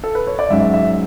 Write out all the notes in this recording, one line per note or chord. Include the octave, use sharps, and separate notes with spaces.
A4
B4
C#5
D5
G#2 F#3 C#4 E5
E5